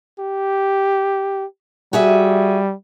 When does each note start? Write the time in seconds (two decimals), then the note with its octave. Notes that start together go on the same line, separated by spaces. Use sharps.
0.19 G4
1.93 G3 F#4 G#4 E5